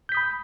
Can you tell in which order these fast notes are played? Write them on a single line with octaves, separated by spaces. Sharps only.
G6 B6 D#6 B5